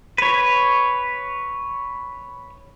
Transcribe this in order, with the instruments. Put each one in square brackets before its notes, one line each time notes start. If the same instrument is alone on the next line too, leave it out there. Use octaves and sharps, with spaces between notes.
[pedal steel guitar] B4 C#5